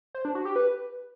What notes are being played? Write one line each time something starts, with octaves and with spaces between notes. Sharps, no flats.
C5
D4
F#4
G4
B4